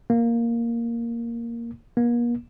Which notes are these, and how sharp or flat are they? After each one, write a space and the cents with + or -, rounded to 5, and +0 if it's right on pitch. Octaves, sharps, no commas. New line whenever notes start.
A#3 +0
A#3 +40